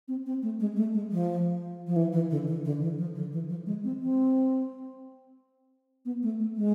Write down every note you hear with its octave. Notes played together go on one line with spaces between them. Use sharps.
C4
C4
A3
G#3
A3
G#3
F3
F3
E3
E3
D3
E3
D3
E3
F3
D3
E3
F3
G#3
C4
C4
B3
A3
A3
G#3